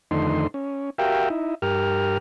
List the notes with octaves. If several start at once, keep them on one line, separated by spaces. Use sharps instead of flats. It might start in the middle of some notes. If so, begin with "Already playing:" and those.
F2 D3 D#3 A3 D#4 C6
C#4
F#4 G4 A#4 E5 F5 G5
D#4 E4
G2 G4 A#4 F6